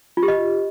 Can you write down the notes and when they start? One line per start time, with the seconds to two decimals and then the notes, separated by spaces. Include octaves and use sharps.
0.17 F4
0.23 G4
0.28 D#5